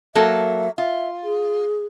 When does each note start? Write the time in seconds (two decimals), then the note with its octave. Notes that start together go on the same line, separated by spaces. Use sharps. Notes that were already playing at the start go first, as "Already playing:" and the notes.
0.15 F#3 A#3 A4 E5
0.78 F4 E5
1.24 G#4